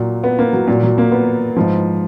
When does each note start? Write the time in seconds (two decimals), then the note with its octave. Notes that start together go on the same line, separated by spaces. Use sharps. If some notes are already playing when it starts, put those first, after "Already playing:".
Already playing: A#2 F#3
0.24 B3
0.39 A#3
0.53 F#3
0.67 A#2 F#3
0.83 F#3
0.98 A#3
1.12 B3
1.56 G#2 F3